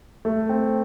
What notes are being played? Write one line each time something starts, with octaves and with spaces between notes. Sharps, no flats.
A3
C4